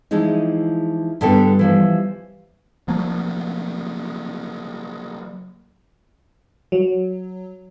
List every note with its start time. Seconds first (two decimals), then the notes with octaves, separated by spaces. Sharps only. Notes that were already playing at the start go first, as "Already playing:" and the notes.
0.11 E3 F3 G#3 D#4
1.21 G2 D3 G3 B3 A4 G5
1.59 E3 F3 G3
2.88 F3 F#3 A#3
6.72 F#3